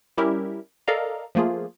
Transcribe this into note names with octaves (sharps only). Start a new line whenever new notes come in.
G3 C#4 E4 G4 A#4 E5
A4 A#4 D5 D#5 F5 A#5
F3 A3 A#3 F4 G#4